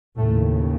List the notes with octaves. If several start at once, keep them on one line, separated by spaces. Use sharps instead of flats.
D#2 A2 C#3 A3